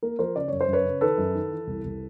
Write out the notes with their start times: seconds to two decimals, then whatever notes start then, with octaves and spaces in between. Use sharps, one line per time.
0.03 A#3 A#4
0.19 F3 A#4 C5
0.36 C#3 D5
0.48 F#2 C#5
0.61 C5
0.68 F#2 B4 C#5
0.85 C#3
1.01 D#3 A4 B4
1.18 F#2
1.35 D#3
1.51 E3
1.67 C2
1.84 C2